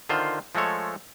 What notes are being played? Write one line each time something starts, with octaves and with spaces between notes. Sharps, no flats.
D3 D#3 F4 C5
F3 G#3 A3 A4 C#5